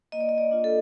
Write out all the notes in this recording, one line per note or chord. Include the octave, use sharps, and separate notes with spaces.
A#3 D#5
D5
D#5
D5
D4 F4
A4